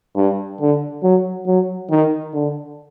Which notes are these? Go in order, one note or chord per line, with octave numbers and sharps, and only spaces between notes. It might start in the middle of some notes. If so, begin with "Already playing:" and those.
G2
D3
F#3
F#3
D#3
D3